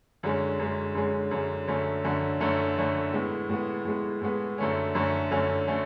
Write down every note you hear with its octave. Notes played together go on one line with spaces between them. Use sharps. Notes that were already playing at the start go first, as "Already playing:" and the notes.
F#2 D3 G#3 C#4
F#2 D3 G#3 C#4
F#2 D3 G#3 C#4
F#2 D3 G#3 C#4
F#2 D3 A3 C#4
F#2 D3 A3 C#4
F#2 D3 A3 C#4
F#2 D3 A3 C#4
A2 G#3 B3
A2 G#3 B3
A2 G#3 B3
A2 G#3 B3
F#2 D3 A3 C#4
F#2 D3 A3 C#4
F#2 D3 A3 C#4
D3 A3 C#4